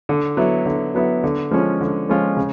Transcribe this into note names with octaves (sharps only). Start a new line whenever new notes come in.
D3
F#3 B3 E4
D3
F#3 B3 E4
D3
F3 G#3 C#4 F4
D3
F3 G#3 C#4 F4
C#3